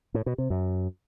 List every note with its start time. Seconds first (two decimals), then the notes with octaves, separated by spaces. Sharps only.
0.14 A2
0.26 B2
0.38 C3
0.50 F#2